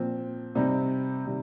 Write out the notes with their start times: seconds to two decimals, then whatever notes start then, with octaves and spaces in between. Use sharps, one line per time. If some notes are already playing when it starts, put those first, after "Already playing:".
Already playing: A#2 F3 C4
0.55 C3 G3 C4 D#4
1.25 C3 D#3 G3